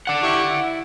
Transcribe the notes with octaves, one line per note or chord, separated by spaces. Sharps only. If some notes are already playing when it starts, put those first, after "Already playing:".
D5 F#5
E4 G4 C#6
E4